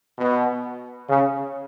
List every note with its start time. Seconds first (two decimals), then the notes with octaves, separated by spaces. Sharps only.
0.18 B2
1.09 C#3